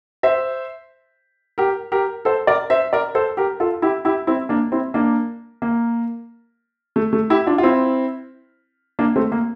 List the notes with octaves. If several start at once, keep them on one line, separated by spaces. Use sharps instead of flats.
C5 E5
G4 A#4
G4 A#4
A4 C5
A#4 D5
C5 E5
A#4 D5
A4 C5
G4 A#4
F4 A4
E4 G4
E4 G4
C4 E4
A#3 D4
C4 E4
A#3 D4
A#3
A3
A3
E4 G4
D4 F4
F4
C4 E4
A#3 D4
A3 C4
A#3